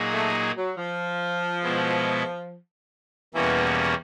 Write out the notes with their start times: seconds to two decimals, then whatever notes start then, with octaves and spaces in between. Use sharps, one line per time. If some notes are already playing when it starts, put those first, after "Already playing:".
Already playing: A#2 F#3 A#3 D#4 G#4
0.13 A3
0.56 F#3
0.77 F3
1.63 B2 G#3 B3 E4
3.34 E2 B2 E3 G3 A#3 C#4